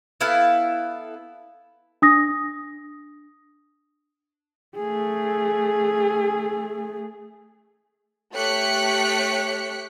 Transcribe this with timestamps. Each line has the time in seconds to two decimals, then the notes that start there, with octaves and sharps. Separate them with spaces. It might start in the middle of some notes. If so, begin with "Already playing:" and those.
0.21 B3 E4 A4 F5
2.02 D4 D#6 A#6
4.76 A3 G#4
8.34 A3 G4 C#5 F#6 B6 C#7